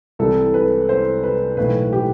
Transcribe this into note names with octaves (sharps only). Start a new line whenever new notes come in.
C2 C3 E3 A4
B4
C5
B4
B1 A2 E3 B4
G4